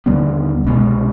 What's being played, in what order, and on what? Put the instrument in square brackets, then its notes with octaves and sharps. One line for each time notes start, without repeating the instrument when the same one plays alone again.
[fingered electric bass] D#2 D3 G3 B3
C2 B2 G#3